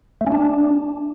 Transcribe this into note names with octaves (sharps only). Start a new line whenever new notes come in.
A3
C#4
D4